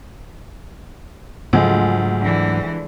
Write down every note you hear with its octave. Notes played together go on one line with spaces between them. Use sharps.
D2 G#2 C#3 F3 F#3 G#3
D3 E3